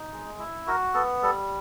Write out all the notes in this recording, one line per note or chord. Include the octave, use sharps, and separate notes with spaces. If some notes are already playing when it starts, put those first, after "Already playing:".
Already playing: D#4
G#3
E4
F#4 A#4
B3 A4
G3 A4